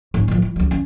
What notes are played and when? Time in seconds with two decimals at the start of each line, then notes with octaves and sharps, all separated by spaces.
0.14 G#2 C#4
0.28 A2 F3
0.42 E3
0.56 C#2 F#3
0.71 C#4